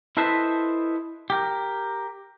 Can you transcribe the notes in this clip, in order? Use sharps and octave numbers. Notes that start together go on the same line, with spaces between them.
E4 A4 B4 C5 D#5 E5
G4 A#4